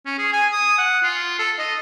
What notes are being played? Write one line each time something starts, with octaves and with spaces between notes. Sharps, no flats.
C#4
G#4
G#5
D#6
F#5
F4
A4
D#5